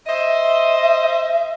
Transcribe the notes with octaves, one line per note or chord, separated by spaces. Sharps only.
C5 D#5 E5